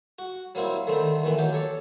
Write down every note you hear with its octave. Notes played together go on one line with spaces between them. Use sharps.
F#4
F#3 G3 A#3 C4 E4
D3 D#3 G3 A3 C4 D#4
D#2 D#3 E3 A3 B3
D#2 F#3 G4 G5
A4 C#5 D5